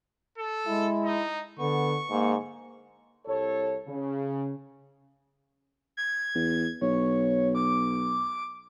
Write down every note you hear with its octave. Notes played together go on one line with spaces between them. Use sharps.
A4
G#3 E4
D#4
D3 B3 C#6
G#2 A#3
C2 A4 C#5
C#3
G#6
E2
B1 C#5
D6